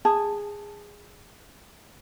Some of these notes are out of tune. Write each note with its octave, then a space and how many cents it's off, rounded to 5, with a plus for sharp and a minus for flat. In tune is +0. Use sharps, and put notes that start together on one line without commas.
G#4 -15 A5 +0